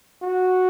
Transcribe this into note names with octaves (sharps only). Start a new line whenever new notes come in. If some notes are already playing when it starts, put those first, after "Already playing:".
F#4